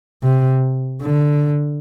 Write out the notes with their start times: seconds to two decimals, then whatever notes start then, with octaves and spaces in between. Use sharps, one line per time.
0.23 C3
1.02 D3